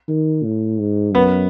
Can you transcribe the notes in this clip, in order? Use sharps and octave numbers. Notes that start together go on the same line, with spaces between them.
D#3
A2
G#2
F#2 B3